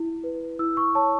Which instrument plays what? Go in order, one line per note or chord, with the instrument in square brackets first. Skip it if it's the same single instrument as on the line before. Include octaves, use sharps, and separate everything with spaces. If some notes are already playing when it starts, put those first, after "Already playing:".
Already playing: [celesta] E4
B4
E4 E6
C#6
C#5 A5